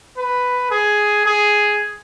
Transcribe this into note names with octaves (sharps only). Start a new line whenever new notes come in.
B4
G#4
G#4